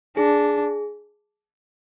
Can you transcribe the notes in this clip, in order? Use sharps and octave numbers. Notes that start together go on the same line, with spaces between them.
D4 G#4